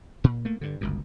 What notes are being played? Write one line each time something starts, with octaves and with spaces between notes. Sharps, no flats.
A#2
A3 A#3
G2 D3
G1 C#2 F#2